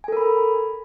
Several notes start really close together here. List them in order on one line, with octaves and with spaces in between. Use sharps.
G#5 A4 A#4 B5